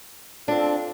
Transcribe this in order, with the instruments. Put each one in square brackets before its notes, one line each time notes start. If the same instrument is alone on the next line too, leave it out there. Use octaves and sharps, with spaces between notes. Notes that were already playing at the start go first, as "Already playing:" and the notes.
[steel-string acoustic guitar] C4 D4 [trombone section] F4 A4